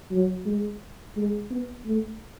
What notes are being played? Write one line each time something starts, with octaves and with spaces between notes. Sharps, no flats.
F#3
G#3
G#3
B3
A3